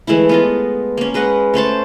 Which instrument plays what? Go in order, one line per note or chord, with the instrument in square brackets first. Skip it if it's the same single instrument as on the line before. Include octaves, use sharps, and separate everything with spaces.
[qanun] E3 G#3 A3 E4
B3 F4 D#5
A#3 C#4
G#3 B4 D#5 F#5
A3 C#4 C5 A5